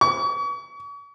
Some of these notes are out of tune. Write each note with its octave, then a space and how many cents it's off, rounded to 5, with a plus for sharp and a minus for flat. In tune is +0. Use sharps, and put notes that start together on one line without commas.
C#6 +40